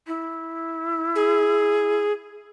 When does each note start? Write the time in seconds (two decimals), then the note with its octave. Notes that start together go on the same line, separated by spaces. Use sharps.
0.07 E4
1.16 G#4